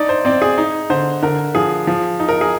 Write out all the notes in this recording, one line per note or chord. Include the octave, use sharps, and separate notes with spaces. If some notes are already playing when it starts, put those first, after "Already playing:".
Already playing: D4 D#4 D5
C5
C4 D5
G#4
D#4
D3 C5
D3 A#4
F3 G#4
F3
D#4
A#4
G#4